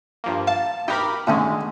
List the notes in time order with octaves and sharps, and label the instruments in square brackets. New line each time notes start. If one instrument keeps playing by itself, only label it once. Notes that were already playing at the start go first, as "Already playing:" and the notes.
[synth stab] G2 F3 A#3
[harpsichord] F5 [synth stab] A5
[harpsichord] D#4 B4 [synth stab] G4 A#4 B5
[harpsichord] A2 D#3 C#4 [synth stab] D3 G#3